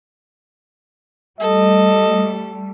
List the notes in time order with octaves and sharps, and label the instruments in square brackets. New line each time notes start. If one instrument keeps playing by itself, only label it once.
[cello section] G3 A3 [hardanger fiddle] A4 [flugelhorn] D#5